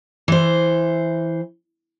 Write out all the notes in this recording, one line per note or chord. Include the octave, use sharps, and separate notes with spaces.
E3 C5